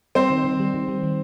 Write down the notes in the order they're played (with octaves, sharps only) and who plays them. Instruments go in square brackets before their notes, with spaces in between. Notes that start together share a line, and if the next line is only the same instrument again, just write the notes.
[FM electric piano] G3 [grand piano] C4 C5
[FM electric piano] D#3
D#3
G3
D#3
G3
D#3